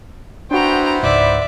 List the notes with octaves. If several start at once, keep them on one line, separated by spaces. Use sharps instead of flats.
B3 D4 E4 F#4 C5 G5 A#5
C#2 G#2 D5 E5